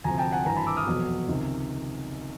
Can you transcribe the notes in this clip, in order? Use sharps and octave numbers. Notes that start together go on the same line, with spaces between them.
D2 C3 F3 G#5 A#5
G5 A5
F#5 G#5
G#1 G2 E3 G#5 A#5
A5 B5
D6 E6
D#6 F6
F1 E2 B2 F#3
C#2 C3 D#3